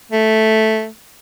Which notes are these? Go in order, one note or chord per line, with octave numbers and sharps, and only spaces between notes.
A3